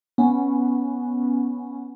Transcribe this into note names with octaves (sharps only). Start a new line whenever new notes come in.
B3 C#4